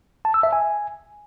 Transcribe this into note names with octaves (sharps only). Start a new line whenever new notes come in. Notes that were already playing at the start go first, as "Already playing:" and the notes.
A5
E6
E5
G#5